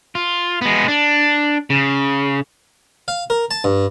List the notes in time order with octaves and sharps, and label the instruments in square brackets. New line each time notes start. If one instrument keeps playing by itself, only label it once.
[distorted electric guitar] F4
G#3 B3
D4
C#3
[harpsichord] F5
A#4
A5
G2